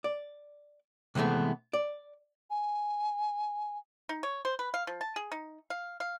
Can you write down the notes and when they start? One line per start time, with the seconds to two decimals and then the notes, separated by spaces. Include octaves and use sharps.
0.04 D5
1.15 C3 E3 G#3 A3 B3
1.73 D5
2.50 G#5
4.09 D#4
4.23 C#5
4.45 C5
4.59 B4
4.74 F5
4.87 F3
5.01 A5
5.16 G#4
5.32 D#4
5.70 F5
6.00 F5